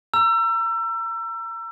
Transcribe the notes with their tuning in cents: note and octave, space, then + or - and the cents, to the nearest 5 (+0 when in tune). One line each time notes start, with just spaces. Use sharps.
A#5 +0 E6 +30